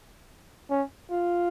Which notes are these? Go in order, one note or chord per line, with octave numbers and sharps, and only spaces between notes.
C#4
F4